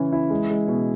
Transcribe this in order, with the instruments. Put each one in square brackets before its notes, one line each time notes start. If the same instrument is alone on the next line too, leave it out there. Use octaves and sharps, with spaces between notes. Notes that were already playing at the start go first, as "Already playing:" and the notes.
Already playing: [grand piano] C#3 E3 C#4
E4
G#3
G#3
B2